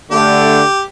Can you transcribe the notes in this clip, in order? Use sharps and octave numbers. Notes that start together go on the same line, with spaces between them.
D3 A3 G4